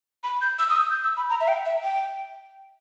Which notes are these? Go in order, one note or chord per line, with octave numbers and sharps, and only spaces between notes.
B5
G6
E6
D#6
E6
G6
E6
B5
A#5
E5
G5
E5
G5